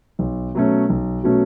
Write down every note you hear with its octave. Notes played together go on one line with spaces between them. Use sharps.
B1
B2 F#3 A3 C#4
B1
B2 F#3 A3 C#4